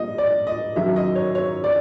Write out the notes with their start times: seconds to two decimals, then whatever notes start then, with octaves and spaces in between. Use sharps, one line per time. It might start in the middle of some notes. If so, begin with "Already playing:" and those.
Already playing: A#2 G3 D#5
0.18 D5
0.47 D#5
0.76 F#2 D#3 F#3 E5
0.96 D#5
1.15 C#5
1.35 C#5
1.64 D5